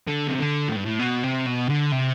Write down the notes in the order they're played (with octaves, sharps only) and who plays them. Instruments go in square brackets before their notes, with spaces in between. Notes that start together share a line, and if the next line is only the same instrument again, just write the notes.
[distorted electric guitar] D3
C3
D3
A2
G2
A2
B2
C3
B2
D3
C3